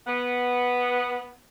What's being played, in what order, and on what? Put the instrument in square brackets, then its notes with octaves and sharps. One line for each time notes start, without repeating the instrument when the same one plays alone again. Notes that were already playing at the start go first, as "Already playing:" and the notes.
[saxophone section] B3